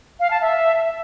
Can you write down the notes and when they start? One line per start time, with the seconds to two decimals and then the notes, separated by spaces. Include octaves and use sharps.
0.20 F5
0.31 A5
0.41 E5